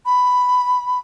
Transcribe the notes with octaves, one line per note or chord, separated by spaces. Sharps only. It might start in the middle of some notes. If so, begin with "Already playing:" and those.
B5